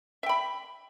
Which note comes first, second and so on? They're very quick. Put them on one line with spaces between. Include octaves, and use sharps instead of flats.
E5 G5 B5